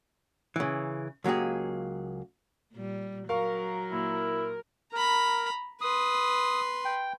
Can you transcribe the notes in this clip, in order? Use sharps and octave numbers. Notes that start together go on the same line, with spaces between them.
C#3 E3
C#2 F#3 A#3 G4 G#4
A#2 G3
F#3 A#4 F5 C#6
A#2 E4
A#4 A#5 B5
B4 C6 D#6
G5